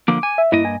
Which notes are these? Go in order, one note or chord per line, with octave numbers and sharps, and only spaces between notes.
D3 F3 A#3 D6
G#5
E5
G2 A#3 E4 D#5
G#5